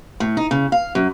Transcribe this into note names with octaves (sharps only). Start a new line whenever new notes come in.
A2
D#4
C#3
F5
F#2